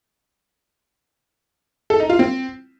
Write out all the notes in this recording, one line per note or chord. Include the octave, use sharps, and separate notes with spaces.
A4
D#4
F4
C4